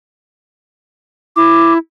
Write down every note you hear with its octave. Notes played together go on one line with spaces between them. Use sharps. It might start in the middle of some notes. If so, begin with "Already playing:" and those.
E4 D6